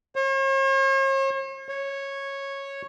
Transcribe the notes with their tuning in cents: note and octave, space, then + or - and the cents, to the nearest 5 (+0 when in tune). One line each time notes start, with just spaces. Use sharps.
C#5 -45
C#5 -10